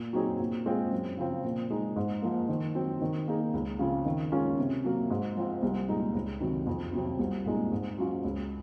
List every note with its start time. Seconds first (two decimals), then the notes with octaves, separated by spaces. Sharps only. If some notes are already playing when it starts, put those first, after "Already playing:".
Already playing: A#2
0.13 F#3 C4 D#4 G#4
0.40 A#2
0.66 G#3 C4 F4 G#4
0.91 F#2
1.17 C#3 F3 C4 F4
1.44 A#2
1.70 G#3 D#4
1.96 G#2
2.22 F3 A#3
2.49 D#3
2.75 F#3 C4
3.01 D#3
3.28 A#3 D#4 G#4
3.54 C#2
3.79 C#3 F3 C4 F4
4.05 D#3
4.32 G#3 C#4 F4 A#4
4.58 C3
4.84 F#3 A#3
5.10 G#2
5.36 F3 C4 F4
5.62 C2
5.88 A#2 G#3 D#4
6.14 C#2
6.40 C3 D#3 F#3
6.66 F2
6.93 C3 F#3 C4
7.19 C2
7.45 A#2 G#3 D#4
7.72 G#2
7.98 F#3 C#4 F4
8.24 C#2